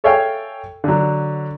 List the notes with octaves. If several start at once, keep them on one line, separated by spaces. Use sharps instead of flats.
A4 C#5 E5 F5 G5 G#5
D3 F#3